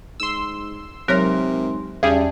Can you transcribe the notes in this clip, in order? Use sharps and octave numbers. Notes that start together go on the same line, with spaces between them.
G#2 C6 E6
C3 F#3 G#3 D#4 A#4 C#5 C6 A#6
E2 C#3 G3 C#4 G#4 E5 A5